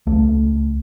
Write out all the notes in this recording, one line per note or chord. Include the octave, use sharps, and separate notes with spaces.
C#2 A3